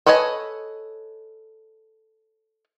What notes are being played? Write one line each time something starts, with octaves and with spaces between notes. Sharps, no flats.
A4 B4 C#5 D#5 G#5